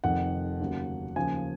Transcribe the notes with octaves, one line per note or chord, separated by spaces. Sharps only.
F1 F2 D#3 F#5
D#2 C#3 F#3
D#2 C#3 F3 G#5